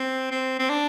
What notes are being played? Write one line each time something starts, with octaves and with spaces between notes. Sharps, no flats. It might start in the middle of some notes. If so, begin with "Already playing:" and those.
Already playing: C4
C4
C4
D4